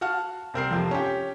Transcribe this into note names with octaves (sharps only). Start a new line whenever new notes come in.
F#4 F5 F#5 A5 F6
C2 C4 A#4 C7
F2 C3 F3
C#4 G4